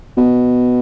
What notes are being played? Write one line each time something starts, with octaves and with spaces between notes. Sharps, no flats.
B2